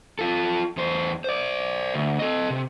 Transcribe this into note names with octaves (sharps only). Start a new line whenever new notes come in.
F4 A4
E2 C5
C5 D5
D2
A4 D#5
C3